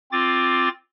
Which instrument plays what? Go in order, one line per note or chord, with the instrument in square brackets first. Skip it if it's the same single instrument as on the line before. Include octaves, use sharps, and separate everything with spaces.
[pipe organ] C4 F4 D6 A6